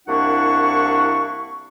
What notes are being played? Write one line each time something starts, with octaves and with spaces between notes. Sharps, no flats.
C2 A#3 D4 E4 F#5 C#6